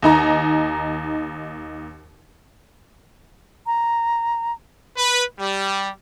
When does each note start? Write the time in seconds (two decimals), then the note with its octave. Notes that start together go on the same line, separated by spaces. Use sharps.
0.02 D#2 D#4 A#5
3.66 A#5
4.97 B4
5.38 G3